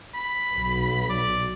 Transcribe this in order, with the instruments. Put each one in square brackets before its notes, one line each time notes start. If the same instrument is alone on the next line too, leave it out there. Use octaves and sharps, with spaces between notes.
[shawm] B5
[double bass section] B1
[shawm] D5